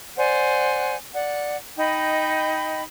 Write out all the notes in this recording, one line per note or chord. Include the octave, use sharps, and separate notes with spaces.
C5 D5 F#5 G#5
D5 F#5
D#4 D#5 G5 B5